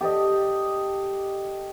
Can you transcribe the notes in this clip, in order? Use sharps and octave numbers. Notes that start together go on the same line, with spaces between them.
G4 A4 D5 D#5